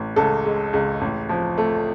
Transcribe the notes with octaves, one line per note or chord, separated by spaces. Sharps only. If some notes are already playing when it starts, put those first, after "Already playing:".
Already playing: A1
C#2 A4
G#3
C#2
A1
F3
A3